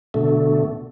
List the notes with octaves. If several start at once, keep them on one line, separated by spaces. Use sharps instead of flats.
B2 D3 A3